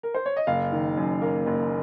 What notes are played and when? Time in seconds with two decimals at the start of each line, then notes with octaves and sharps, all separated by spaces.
0.03 A#4
0.14 C5
0.26 C#5
0.37 D#5
0.47 F#1 F5
0.72 D#3
0.97 F#2
1.22 A#3
1.47 F#1